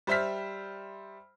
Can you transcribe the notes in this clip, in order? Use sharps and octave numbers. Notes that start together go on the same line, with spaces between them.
G3 C5 E5 F6 B6